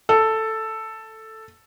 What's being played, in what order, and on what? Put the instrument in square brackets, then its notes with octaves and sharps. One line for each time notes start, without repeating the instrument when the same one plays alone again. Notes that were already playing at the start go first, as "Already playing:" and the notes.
[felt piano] A4